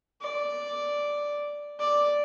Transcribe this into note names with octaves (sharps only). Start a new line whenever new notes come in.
D5
D5